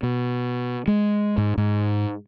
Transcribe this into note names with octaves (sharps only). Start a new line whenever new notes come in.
B2
G#3
G#2
G#2